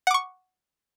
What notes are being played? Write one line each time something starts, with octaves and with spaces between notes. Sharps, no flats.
F#5 C#6 D6